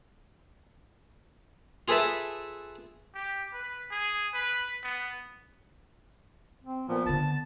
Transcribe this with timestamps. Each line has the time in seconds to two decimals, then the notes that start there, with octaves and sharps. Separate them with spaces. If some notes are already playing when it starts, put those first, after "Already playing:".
1.88 F4 G#4 A4 B4 E5 A5
3.15 G4
3.53 B4
3.91 G#4
4.34 B4
4.83 B3
6.64 C4
6.89 A#2 F3 B3
7.06 D3 C4 A5